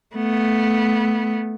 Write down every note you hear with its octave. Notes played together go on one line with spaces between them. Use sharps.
A3 B3